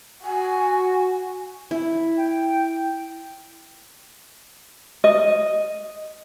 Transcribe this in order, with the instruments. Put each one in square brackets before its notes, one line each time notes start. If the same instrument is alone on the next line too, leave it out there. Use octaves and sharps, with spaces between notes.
[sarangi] F#4 [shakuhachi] G#5
[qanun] E4
[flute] G5
[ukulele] D#5